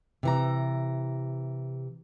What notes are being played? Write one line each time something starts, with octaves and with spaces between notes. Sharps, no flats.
C3 E3 A#5